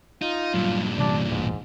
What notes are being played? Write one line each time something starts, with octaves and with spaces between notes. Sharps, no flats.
D#4 F4
G2 A#2 F#3 G3
C3 E3 G3 D4
E1 A1 G#2